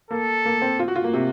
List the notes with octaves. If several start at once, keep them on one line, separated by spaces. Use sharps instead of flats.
A#3 A4
A#3
C4
F4
F#4
F4
A#3
C3